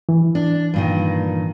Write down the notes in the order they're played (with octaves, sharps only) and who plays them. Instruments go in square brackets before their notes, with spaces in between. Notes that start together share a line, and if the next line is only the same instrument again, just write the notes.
[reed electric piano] E3
[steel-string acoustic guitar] D4
G2 A#2 D#3